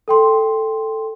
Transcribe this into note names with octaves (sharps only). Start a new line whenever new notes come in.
A4 G5 C6